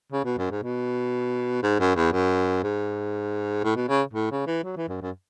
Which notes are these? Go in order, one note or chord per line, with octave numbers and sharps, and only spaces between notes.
C#3
B2
F#2
G#2
B2
G#2
F#2
E2
F#2
G#2
A2
B2
C#3
A2
C#3
E3
F#3
E3
F#2
F#2